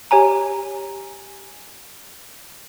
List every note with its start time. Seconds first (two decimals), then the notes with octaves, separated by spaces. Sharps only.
0.11 G4 C#5 G#5 A#5